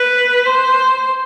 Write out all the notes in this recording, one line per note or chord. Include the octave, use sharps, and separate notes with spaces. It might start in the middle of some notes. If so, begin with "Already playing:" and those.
Already playing: B4
C5